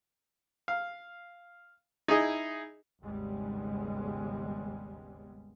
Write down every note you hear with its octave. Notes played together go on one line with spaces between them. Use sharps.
F5
D#4 E4 G#4 D#5
G#1 D#2 C#3 G3 G#3 B3